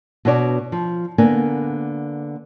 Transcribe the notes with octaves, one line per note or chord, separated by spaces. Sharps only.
B2 B3 D4 F#4 C#5 D5
F3
D3 A#3 B3 A#4 D5 G#5